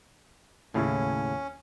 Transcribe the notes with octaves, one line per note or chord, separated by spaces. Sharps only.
D#2 A2 C#3 C#4 E4